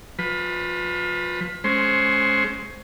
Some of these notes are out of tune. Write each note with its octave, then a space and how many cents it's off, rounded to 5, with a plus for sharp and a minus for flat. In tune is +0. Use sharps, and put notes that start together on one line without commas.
F3 +30 B4 +0
G#3 +25 C#4 +0 C5 +0